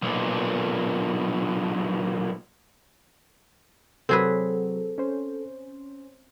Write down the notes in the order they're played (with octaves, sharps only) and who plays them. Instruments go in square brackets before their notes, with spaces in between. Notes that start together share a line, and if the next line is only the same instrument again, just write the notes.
[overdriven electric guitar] B1 A#2
[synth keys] C3 F#3 [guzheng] C4 G#4 B4 [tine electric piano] A4
[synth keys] C#4 C5